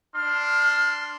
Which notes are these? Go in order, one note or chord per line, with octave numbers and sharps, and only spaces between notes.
D4 C6 F6